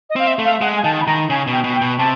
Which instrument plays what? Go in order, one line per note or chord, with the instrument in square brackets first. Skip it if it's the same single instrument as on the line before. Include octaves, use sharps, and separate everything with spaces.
[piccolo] D#5
[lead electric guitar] C4 [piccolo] F5
[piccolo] E5
[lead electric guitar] A3
[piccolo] F5
[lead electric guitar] G#3 [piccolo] F#5
[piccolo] G#5
[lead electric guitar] D#3 [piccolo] A5
[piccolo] B5
[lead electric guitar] D#3 [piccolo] A#5
[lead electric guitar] C#3 [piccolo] G#5
[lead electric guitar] B2
[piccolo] G5
[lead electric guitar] B2
[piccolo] G5
[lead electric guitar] B2
[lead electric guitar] C3 [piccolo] A5